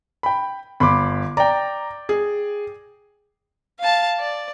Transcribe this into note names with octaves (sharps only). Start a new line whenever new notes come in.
G5 B5
G1 B5 C6 D6
D5 G5 A#5
G#4
F5 A5
D5